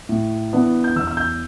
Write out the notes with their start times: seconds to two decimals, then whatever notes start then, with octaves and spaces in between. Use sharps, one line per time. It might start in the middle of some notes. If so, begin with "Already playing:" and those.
0.09 A2
0.53 E3 B3 D4
0.84 G6
0.96 E2 E6
1.07 E6
1.17 G6